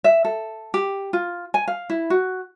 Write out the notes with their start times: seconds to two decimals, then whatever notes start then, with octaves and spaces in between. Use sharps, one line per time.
0.04 E5
0.25 A4
0.74 G4
1.13 F4
1.54 G#5
1.68 F5
1.90 E4
2.10 F#4